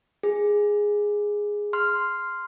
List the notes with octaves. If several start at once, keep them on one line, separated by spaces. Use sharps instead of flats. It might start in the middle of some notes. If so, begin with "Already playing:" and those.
G#4
C6 F6